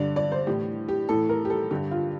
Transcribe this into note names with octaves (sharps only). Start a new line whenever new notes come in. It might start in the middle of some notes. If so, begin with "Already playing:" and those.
Already playing: G2 D3 D5
D5
C5
A2 E3 G4
G4
A2 E3 A4
A#4
G4
A4
G2 D3 G4
F4